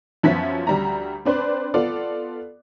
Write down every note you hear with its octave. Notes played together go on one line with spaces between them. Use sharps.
F#2 F3 B3 C#4 E5 B6
D2 G3 A#5
C4 D4 B4 C5
B3 F4 A4 D5